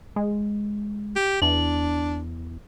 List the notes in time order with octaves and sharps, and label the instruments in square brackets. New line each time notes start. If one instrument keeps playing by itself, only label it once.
[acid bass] G#3
[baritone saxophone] G4
[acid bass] E2 [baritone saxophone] D4